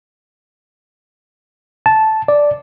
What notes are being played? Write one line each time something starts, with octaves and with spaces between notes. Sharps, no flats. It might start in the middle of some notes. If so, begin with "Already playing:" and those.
A5
D5